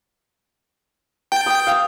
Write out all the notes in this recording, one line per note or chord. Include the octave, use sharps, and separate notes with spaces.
G5 A5
D#6
F5 E6